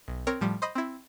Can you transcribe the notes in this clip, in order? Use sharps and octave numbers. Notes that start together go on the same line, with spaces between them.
B1
C4 A#4 C#5
A2 F3 G3
C5 D#5 B5
C4 E4